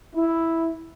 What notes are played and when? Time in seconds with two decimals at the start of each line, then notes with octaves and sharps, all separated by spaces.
0.14 E4